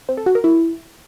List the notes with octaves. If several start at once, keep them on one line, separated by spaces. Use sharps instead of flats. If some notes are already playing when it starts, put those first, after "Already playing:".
C4
A4
F#4
A#4
E4